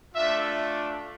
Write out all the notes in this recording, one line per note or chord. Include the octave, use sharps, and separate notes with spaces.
A3 D4 F4 E5